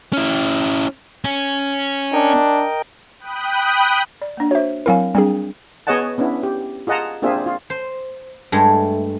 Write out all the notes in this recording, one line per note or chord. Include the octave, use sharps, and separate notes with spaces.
C#4 E4
C#4
D4 A#4 D#5 G5
G5 B5 D#6 F#6 G6
D5
A#3 D4
F#4 C5 C#5 E5
F#3 C4 E4 A#4 F5 G#5
G3 C4 D4 G#4 G5
B3 G#4 C#5 D#5 F#5 A5
B3 C#4 D4 E4
G4
F4 G#4 D#5 F#5 A5 A#5
A#3 C4 D4 F4 G#4 E5
F4
C5
G2 G#3 A3